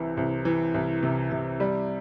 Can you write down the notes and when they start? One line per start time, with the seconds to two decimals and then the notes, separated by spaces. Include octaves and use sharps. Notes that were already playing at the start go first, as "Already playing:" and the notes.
Already playing: C2 C3 E3
0.17 C2
0.45 E3
0.74 C2
1.03 C3
1.31 C3
1.60 G3